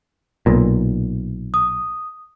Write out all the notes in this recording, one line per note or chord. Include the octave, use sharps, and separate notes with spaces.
B1 A#2
D#6